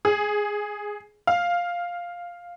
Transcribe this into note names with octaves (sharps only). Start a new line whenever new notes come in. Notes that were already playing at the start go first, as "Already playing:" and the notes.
G#4
F5